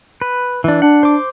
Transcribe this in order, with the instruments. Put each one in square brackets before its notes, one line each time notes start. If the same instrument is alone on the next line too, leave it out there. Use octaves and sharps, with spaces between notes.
[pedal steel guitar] B4
E3 D4
[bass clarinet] D4 [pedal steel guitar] F#5
[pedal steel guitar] C5 D6